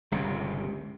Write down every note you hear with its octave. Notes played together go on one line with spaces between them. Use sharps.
G1 C#2 C3